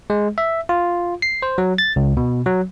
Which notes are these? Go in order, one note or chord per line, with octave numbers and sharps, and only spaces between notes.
G#3
E5
F4
C7
C5
F#3
A6
C#2
B2
F#3